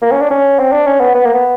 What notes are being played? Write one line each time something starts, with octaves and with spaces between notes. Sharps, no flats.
A#3
C#4
D4
C#4
C4
D4
C#4
B3
B3
A#3
B3